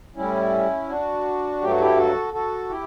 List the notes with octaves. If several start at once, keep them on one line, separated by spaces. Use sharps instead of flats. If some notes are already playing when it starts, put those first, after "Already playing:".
A2 G3 C#4 E4
D4 F#4
G2 F#3 A3 G4
F#4
E4 G4
F#4 A4
F#4 A4
E4 G4